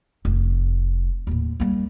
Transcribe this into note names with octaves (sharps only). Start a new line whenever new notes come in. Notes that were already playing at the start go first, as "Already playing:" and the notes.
F1
D#2 A2
G3 A#3